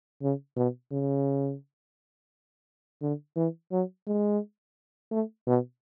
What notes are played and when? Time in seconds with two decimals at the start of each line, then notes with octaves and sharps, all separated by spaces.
0.22 C#3
0.56 B2
0.92 C#3
3.02 D3
3.36 E3
3.72 F#3
4.07 G#3
5.12 A3
5.47 B2